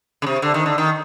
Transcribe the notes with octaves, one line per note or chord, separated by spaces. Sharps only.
C#3
C3
D3
D#3
D3
D#3